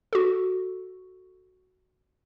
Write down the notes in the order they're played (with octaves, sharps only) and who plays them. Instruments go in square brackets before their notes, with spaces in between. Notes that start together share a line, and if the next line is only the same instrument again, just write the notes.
[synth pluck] F#4 A4